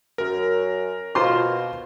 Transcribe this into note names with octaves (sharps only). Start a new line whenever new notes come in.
F#2 A#4
B2 F4 C5 C6